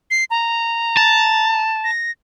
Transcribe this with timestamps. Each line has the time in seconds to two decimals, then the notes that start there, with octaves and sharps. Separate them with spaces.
0.11 C7
0.31 A#5
0.97 A5
1.84 A#6